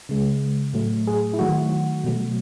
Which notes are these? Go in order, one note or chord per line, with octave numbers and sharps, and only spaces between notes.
C#3 G#3
A2 F#3 A3
G#4
E4
D#3 F#3 A3 F#4
B2 F#3 A3